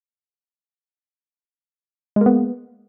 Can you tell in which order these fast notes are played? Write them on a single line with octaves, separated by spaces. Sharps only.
G#3 A#3 B3